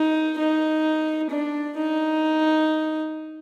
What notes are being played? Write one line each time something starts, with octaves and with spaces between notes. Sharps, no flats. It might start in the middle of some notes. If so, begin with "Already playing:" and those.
Already playing: D#4
D#4
D4
D#4